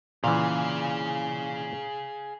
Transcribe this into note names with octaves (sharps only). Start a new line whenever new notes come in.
A#2 C#3 E3 G#4 F5